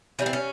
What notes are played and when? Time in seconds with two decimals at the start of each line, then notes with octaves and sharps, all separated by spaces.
0.19 E3 G3 A#3 C#4
0.26 C4
0.33 C#4